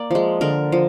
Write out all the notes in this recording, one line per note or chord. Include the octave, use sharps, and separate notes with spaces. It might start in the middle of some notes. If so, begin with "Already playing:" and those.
Already playing: A#3 D5
F3 G#3
D3 A#4
F3